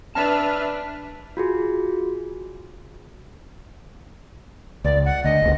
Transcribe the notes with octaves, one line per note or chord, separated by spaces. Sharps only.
D4 B4 E5 A5 F6
F4 F#4 G#4
C#2 D5
F#5
D2 D#5
F#1 C#2